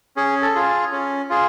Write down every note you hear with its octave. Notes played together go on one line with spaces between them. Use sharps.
C#4 G#4
A4
F4 G#4
C#4
F4 G#4